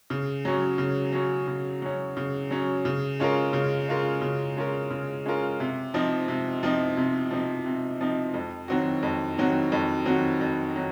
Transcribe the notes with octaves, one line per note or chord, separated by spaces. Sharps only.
C#3
F#3 C#4
C#3
F#3 C#4
C#3
F#3 C#4
C#3
F#3 C#4
C#3
G#3 C#4 F4 A#4
C#3
G#3 C#4 F4 A#4
C#3
G#3 C#4 F4 A#4
C#3
G#3 C#4 F4 A#4
C3
F3 C4 D#4
C3
F3 C4 D#4
C3
F3 C4 D#4
C3
F3 C4 D#4
F2
D#3 F#3 C4 F#4
F2
D#3 F#3 C4 F#4
F2
D#3 F#3 C4 F#4
F2
D#3 F#3